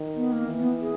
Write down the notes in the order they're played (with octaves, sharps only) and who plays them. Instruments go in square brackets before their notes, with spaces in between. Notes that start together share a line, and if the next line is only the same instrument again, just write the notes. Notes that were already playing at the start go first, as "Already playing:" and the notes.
Already playing: [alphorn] D#3
[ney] B3
A#3
[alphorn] E3
[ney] B3
G#4